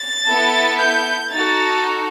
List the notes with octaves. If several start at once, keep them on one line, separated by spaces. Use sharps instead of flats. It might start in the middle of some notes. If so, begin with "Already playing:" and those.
Already playing: A6
B3 E4 A4
G6
D#4 F#4 A4 A6